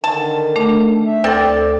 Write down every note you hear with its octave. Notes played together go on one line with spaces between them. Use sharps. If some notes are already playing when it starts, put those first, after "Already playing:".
D3 D#3 A5
A3 D4
E5
D2 C4 A4 D5 G5